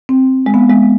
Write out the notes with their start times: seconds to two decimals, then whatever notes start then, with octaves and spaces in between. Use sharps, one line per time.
0.09 C4
0.46 G#3
0.54 B3
0.70 G#3